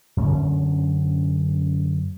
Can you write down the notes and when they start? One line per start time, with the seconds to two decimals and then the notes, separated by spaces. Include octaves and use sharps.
0.17 F#2 D3 C#4